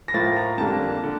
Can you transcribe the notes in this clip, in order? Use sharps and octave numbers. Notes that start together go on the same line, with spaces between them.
A#6
A2 F3 A#3 A6
A#5
F2 D3 G3 A#3 A5
D3